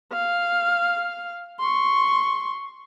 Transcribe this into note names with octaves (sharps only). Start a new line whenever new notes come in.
F5
C6 C#6